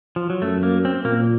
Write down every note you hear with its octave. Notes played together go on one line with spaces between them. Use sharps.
F3
F#3
F#2 A3
A#3
C4
A#2 A#3